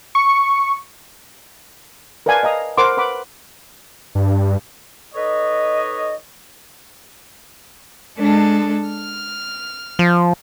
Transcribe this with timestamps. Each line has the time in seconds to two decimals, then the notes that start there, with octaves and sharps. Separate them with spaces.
0.15 C#6
2.26 A#4 B4 D5 F5 G#5 A5
2.43 D#5 F5 A#5 D#6
2.78 A#4 C5 F#5 B5 C6 D6
2.97 B4 F#5 B5 D6
4.15 G2
5.15 D#4 A4 B4 C#5 D#5
8.18 G#3 D4 A4
8.90 F6
9.99 F3